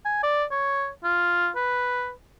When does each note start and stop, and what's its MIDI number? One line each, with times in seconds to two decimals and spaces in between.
0.05 0.20 80
0.23 0.45 74
0.52 0.89 73
1.04 1.49 65
1.56 2.11 71